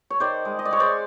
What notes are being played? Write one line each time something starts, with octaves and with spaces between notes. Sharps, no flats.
C#5
D#3 C5 D5
G#3
D#5
D5
G#3 C#5
C5 D5